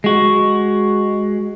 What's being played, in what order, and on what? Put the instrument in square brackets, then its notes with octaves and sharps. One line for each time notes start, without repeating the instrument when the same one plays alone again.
[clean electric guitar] G#3 F#4